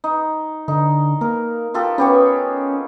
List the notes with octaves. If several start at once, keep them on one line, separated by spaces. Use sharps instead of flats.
D#4
D3 D#4
A#3 A#4
F4 G4 A4
B3 C#4 G4 C#5